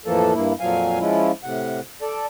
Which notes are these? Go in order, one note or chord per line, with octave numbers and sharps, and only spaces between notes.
F2 A2 E3 F3 A#3 A4
G2 A#3 E4
F2 A#2 F3 F#3 F5 G#5
F3 G#3 C#4 E4 F4
A2 C3 F#5
A4 D5